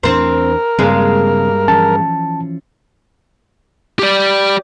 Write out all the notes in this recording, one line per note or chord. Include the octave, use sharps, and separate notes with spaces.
E2 E3 C4 D4 A#4 C5
G2 C#3 G#3 A#3 C4
E3 F3 C#4 A5
G4 D5